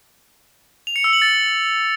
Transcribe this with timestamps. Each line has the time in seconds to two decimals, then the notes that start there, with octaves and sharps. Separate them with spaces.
0.87 F7
0.96 C#7
1.04 E6
1.13 F#7
1.22 A6